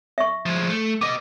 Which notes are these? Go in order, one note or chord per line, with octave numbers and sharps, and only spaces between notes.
E5 C#6
F3 G#3
A3
B3 D#5 D6